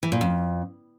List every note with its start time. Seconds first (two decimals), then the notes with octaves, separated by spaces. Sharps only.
0.03 E3
0.12 A#2
0.21 F2